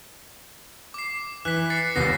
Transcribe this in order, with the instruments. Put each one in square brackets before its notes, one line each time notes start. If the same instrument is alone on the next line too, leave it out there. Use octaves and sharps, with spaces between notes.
[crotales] D6 C7
[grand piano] E3 [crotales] F#6 B6
[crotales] A6 C7 C#7
[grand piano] D#1 D#2 B3 [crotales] A#6 C7